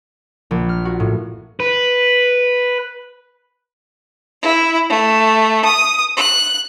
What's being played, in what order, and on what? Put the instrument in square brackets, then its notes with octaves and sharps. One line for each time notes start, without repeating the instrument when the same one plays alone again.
[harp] A#1
F6
F#4
A2
[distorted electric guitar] B4
[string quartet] E4
A3
D#6
F#6